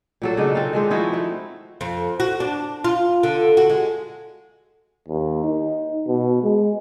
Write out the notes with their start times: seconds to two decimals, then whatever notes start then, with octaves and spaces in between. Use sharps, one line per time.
0.22 A#2 F#3 A4
0.37 C#3 D4 D#4 D#5
0.55 C4 A4 F5
0.73 D#3 G#3 D4
0.91 F3 D#4 E4 F#4
1.14 A3
1.81 F2
2.20 F#4
2.40 D4
2.84 F4
3.23 D3
3.57 F#4
3.70 G#3
5.08 D#2
5.44 D#4
6.07 B2
6.43 G#3